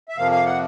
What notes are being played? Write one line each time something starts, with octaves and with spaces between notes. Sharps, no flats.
E5
F2 C3 F3 A#3 F5
F5
F#5